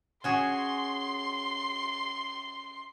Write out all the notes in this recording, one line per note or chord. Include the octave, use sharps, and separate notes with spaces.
C#4 F#4 G#4 C6